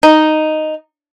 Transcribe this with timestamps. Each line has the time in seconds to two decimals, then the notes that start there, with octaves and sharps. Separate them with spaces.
0.03 D#4